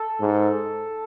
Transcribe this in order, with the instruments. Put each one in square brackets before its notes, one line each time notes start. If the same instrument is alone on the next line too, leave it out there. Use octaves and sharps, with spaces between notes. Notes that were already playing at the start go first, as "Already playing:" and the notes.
Already playing: [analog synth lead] A4
[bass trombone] G#2